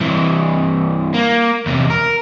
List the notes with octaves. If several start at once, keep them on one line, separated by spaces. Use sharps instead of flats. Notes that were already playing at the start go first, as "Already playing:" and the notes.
C2 E3
A#3
E2 C3
A#4